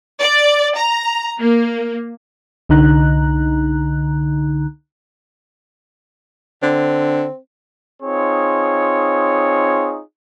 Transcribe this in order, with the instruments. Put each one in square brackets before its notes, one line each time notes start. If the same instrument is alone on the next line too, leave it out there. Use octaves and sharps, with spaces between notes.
[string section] D5
A#5
A#3
[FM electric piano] C2 D3 D#4 A#5 F#6
[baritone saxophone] D3 [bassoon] C4
[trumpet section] C4 D#4 F4 G#4 C#5